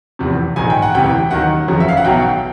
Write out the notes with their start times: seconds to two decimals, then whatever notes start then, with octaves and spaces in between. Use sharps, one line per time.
0.19 F1 E2 C3
0.56 A#1 G#2 D#3 G#5
0.70 G5
0.82 F#5
0.94 E1 D2 C3 E3 G5
1.31 D#2 D#3 F#3 F#5
1.68 G1 F2 C#3 F#3
1.80 E5
1.88 F5
1.97 F#5
2.05 B1 B2 F#3 G5